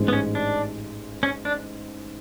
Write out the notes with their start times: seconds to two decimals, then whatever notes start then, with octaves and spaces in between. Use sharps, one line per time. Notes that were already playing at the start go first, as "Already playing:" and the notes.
Already playing: A1 G#2 G#3
0.08 B3
0.13 C#4
0.35 D4
1.23 C#4
1.45 D4